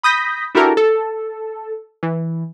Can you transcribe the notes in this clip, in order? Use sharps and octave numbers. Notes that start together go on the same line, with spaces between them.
B5 D#6 G6 A#6 B6
D4 E4 F#4 G4 A4 A#4
A4
E3